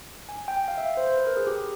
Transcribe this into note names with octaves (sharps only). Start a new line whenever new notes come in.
G#5
G5
F5
E5
C5
C5
B4
A#4
G#4
G4